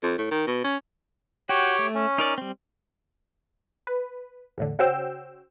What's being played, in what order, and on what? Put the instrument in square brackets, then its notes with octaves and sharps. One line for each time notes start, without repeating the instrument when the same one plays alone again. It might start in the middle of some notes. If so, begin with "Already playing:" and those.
[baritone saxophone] F2
A2
D#3
B2
C#4
[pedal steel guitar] F#4 [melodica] G4 C#5 G5
[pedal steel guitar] A3
[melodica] C#4
[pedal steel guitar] D#4 A#4 D5
G3 C4
[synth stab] B4
E2 A2 D3
C#3 C#4 F#4 C5 G5 E6